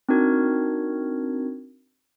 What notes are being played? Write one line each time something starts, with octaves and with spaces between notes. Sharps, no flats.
C4 D4 D#4 F#4 A#4 G#6